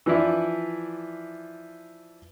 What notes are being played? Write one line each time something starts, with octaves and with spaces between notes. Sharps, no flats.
E3 F3 D4 E4